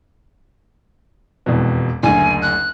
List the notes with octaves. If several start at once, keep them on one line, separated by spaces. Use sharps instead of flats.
E1 F2 B2
F#1 D2 G#5
F#6